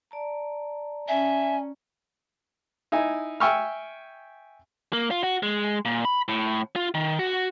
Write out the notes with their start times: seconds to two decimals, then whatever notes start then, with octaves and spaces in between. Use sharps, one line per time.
0.11 D5 A5 A#5
1.08 C#4 E5 G#5
2.92 D#4 E4 G#5
3.40 E5 G5 G#5 C#6 E6 F6
4.93 A#3
5.11 F4
5.23 F#4
5.43 G#3
5.85 A#2
6.05 B5
6.28 A2
6.76 F4
6.94 D#3
7.19 F#4